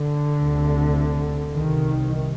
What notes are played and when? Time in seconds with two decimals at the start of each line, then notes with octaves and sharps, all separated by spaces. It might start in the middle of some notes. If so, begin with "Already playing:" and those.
Already playing: D3
0.41 D2 C3
1.54 C2 C3 D#3